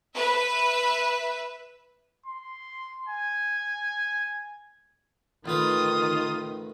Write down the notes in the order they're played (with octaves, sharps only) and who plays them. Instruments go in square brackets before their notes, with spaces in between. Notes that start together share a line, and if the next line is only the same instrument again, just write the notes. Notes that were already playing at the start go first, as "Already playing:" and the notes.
[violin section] B4 E5
[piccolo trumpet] C6
G#5
[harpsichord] A1 B4 [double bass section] D#3 [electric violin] F4 D#6